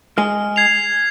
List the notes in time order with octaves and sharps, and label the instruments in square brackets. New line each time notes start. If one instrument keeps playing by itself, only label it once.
[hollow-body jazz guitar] G#3 G#4 [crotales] F6
[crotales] G#6 C7 F7